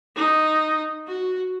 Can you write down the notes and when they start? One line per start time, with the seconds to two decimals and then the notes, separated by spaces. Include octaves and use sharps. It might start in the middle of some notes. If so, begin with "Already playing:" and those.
0.16 D#4
1.07 F#4